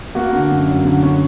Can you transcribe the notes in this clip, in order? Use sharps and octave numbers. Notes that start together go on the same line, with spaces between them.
A#3 F#4
D3
F#2
F#2
D3
C#4